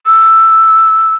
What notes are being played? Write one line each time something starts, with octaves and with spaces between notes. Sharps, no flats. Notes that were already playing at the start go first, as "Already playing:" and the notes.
E6